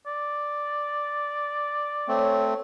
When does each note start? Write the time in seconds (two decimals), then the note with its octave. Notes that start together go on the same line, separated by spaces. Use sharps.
0.07 D5
2.08 A3 C4 C#5